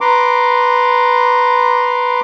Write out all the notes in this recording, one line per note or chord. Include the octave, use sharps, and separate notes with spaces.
B4 A#5 C6 D6